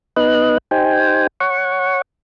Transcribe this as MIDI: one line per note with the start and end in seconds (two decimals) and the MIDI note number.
0.16 0.58 59
0.16 0.58 63
0.16 0.58 71
0.16 0.58 75
0.16 0.58 90
0.71 1.27 63
0.71 1.27 67
0.71 1.27 72
0.71 1.27 79
0.71 1.27 80
1.40 2.02 73
1.40 2.02 78
1.40 2.02 85